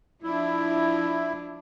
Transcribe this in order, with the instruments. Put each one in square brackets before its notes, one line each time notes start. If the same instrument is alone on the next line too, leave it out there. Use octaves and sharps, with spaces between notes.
[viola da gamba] F3 D4 [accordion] E4